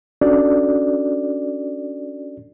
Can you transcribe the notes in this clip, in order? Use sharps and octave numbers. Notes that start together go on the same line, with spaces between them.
C#4 D4 F#4 A4 D5